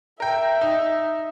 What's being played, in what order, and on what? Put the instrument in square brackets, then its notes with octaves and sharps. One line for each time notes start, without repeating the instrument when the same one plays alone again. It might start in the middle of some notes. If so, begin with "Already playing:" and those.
[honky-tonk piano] A#4 G5 [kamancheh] E5
[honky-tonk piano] D#4